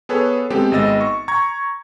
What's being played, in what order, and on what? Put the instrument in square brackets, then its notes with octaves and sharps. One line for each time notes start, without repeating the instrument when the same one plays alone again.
[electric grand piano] B3 G#4 A4 B4 C#5
G#3 B3 C4 G4 A4
G#1 G#3 B3 D#5 E6 A6
C#6
A#5 C#6 G#6